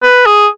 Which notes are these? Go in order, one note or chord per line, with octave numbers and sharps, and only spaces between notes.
B4
G#4